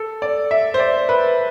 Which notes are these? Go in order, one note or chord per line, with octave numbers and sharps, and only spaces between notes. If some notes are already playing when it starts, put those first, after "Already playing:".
Already playing: A4
D5
E5
C5
D5
B4